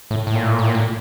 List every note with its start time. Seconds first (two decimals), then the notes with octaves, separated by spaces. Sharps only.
0.11 A2
0.27 A2
0.35 A#2
0.44 A2
0.52 A#2
0.59 A2
0.67 A#2
0.75 A2